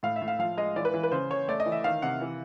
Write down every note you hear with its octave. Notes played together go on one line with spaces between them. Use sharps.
A2 F5
E5
A2
F5
F3 F5
G#3 D#5
E3 D5
B4
E3
B4
C#3 C5
C#3 C#5
A3 D5
D#5
E3
E5
D#3 F5
C3 F#5
E3